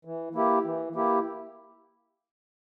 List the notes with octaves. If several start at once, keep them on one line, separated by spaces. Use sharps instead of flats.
E3
A#3 E4 G4
E3
A#3 E4 G4